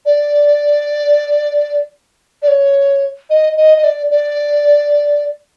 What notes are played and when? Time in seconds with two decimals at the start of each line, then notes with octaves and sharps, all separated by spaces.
0.06 D5
2.42 D5
2.48 C#5
3.30 D#5
3.57 D#5
3.78 D#5
3.84 D5
4.10 D5